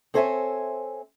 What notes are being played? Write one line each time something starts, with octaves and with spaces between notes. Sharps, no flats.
C4 A4 C5 C#5 E5 G#5